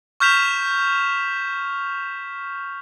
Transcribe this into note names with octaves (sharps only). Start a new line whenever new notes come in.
C#6 F6 G6 B6 E7 F7